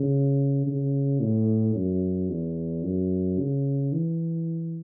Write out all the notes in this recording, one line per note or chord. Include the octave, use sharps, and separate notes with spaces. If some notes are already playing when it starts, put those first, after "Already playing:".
Already playing: C#3
C#3
A2
F#2
E2
F#2
C#3
E3